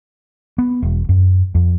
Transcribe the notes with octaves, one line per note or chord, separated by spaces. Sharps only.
B3
E1
F#2
F2